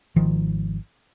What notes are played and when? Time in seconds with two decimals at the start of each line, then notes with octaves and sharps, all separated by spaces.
0.16 G#1 D#3 F3